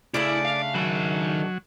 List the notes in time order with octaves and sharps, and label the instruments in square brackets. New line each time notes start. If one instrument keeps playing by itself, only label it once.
[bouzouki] C#3 A3 D4 [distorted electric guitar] E4 [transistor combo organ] D5
[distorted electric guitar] F5
[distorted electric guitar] D#3 B5 [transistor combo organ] F#3